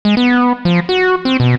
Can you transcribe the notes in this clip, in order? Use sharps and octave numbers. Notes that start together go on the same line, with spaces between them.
G#3
B3
F3
F#4
C4
B2